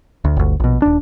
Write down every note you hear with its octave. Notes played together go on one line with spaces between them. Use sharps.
D2
G1 D2
A#1 B2
D#1 D4